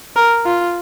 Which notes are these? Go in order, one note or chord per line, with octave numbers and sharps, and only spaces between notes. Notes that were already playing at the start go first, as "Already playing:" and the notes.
A#4
F4